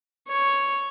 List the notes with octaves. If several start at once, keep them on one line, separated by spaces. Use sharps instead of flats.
C#5